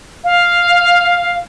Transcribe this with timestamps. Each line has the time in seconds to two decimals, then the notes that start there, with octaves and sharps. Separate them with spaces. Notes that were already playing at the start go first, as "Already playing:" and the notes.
0.24 F5